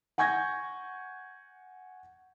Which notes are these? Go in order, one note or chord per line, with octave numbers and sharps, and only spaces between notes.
F#5 G#5 C#6 G6 G#6 A#6